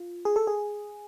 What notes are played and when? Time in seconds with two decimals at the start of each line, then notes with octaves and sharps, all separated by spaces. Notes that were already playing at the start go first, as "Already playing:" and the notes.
Already playing: F4
0.25 G#4
0.36 A4
0.47 G#4